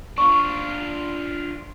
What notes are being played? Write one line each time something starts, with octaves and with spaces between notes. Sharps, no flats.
D4 F4 C#6